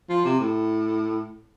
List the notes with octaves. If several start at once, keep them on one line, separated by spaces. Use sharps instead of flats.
F3
C3
A2